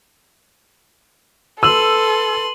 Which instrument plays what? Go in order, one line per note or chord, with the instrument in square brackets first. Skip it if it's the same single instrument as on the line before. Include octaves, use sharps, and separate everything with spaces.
[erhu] A4 [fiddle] B4 C6 [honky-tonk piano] E6 [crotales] D#7 F#7